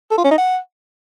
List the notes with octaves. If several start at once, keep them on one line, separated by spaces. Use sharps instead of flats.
A4
F4
C#4
D#4
F#5